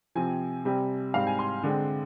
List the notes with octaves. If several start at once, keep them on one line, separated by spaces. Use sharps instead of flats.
C3 F3 C4 G#5
C3 G3 C4
G#2 G3 C4 F5
G#5
C6
D3 G#3 C4